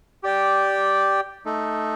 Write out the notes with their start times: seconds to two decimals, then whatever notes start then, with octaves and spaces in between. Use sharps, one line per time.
0.23 G4 D5 G5
1.45 A3 D#4 A4